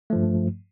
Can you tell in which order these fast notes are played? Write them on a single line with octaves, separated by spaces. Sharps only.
A3 F3 G2